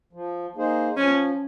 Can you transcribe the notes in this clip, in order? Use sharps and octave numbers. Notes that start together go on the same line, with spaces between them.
F3
A#3 D#4 G#4 C5
F3 C#4